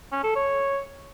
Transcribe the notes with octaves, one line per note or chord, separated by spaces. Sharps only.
C#4
A4
C#5